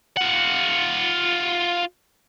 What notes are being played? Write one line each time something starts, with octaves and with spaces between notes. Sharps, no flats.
F4 F#5